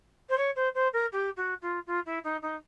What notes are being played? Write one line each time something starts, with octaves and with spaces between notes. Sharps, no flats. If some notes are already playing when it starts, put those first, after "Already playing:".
C5
C#5
C5
C5
A#4
G4
F#4
F4
F4
E4
D#4
D#4